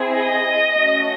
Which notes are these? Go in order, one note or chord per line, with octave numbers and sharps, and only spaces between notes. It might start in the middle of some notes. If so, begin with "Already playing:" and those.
Already playing: C4 E4 G#4
D#5
A3 C#4 F#4